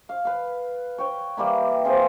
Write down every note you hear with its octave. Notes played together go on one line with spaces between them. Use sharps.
F5
B4 F5
C#5 G5
E3 G3 A#3 E4
C4 F4 G#4